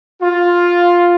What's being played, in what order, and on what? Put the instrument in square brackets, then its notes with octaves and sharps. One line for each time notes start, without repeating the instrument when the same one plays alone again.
[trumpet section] F4